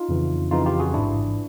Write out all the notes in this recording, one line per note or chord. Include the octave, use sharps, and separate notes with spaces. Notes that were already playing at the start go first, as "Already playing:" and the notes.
Already playing: D#4 F4
F2 C#3 E3
F2 C#3 E3 D#4 F4
F4 G4
F#4 G#4
A1 G#2 E3 D4 E4